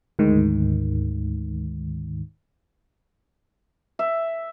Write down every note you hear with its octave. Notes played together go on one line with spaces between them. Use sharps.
D2 G#2 D#3
E5